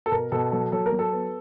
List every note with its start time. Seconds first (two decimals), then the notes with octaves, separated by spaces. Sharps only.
0.06 A4
0.12 B2 A#4
0.32 B2 A4
0.52 F#3 A4
0.72 F#3 A4
0.86 A#4
0.92 F#3
0.99 A4
1.13 B3